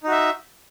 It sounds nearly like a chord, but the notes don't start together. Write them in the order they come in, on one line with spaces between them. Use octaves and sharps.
D#4 F#4 E5